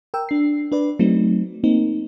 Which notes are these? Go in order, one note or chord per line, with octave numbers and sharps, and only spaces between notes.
A#4 G5 E6
D4 C7
D4 B4 D5
F#3 A3 C4 D#4
A#3 C4 D#4